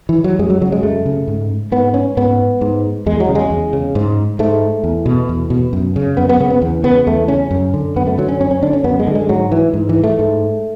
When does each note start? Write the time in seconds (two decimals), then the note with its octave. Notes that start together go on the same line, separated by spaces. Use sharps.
0.09 E3
0.24 F#3
0.39 F#2 G#3
0.50 F#3
0.61 C#3 F#3
0.72 G#3
0.83 F#2 A3
1.06 C#3
1.28 G#2
1.72 G#2 B3
1.94 C#4
2.17 G#2 B3
2.61 G#2
3.06 E2 G#3
3.20 F#3
3.29 C#3
3.35 G#3
3.50 E2
3.73 C#3
3.95 G#2
4.39 G#2 A3
4.84 E2
5.06 B2
5.29 E2
5.50 B2
5.73 F#2
5.96 C#3
6.17 F#2 B3
6.29 B3
6.40 C#3 B3
6.50 B3
6.62 E2
6.84 C#3 B3
7.07 E2 A3
7.28 C#3 C#4
7.51 F#2
7.74 D3
7.96 F#2 B3
8.07 A3
8.18 D3 F#3
8.29 C#4
8.40 F#2 C#4
8.51 C#4
8.62 D3 D4
8.73 C#4
8.84 F#2 B3
8.99 G#3
9.07 D3
9.15 G#3
9.29 G#2 F#3
9.52 E3
9.74 G#2
9.89 E3
10.04 A3
10.19 G#2